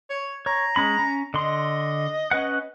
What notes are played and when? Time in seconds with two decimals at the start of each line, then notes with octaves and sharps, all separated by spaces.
0.10 C#5
0.46 C#5 A#5
0.76 G#3 C#4 B5
0.99 C#4
1.34 D3 D#5 C6
2.31 C#4 B4 F#5